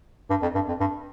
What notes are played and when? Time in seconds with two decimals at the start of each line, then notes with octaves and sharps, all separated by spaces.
0.30 G2
0.42 F2
0.55 G2
0.68 F2
0.80 G2